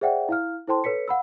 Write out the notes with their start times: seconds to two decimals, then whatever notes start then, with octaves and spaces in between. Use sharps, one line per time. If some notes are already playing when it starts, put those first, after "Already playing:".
0.01 G#4 C5 D5 E5 F#5 G5
0.29 E4 F5 F6
0.67 E4 A4 C5 G5 A5 C6
0.84 A4 B4 C#5 B6 C#7
1.08 F5 F#5 B5 E6